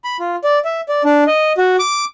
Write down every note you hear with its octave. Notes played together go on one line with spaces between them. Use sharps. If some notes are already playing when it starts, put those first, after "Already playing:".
B5
F4
D5
E5
D5
D4
D#5
F#4
D6